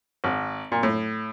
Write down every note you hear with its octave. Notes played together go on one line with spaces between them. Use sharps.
G#1
A#2
A2